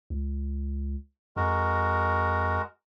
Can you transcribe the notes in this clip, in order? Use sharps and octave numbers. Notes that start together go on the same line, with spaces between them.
C#2
F2 G#3 F#4 A#4